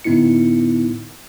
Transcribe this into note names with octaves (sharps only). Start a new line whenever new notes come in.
A2 D3 B3 D#4 E4 C#7